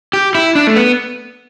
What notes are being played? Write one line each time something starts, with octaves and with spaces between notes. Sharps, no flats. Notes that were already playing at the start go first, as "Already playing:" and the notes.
G4
E4
D4
A3
B3